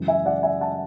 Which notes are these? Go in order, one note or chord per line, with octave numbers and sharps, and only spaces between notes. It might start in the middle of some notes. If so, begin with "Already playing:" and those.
Already playing: F#2 C#3 E3 G#3
E5 G#5
D5 F#5
E5 G#5
F#5 A5